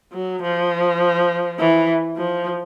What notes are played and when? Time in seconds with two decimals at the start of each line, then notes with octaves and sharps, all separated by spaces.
0.13 F#3
0.43 F3
1.59 E3
2.17 F3